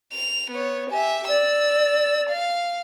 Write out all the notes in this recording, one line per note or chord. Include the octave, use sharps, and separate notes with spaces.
F7
B3 C#5
G4 E5 G#5
D5 E6
F5